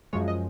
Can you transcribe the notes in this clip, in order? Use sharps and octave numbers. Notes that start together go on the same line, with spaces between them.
F#2 F3 G#3 C#5
D#5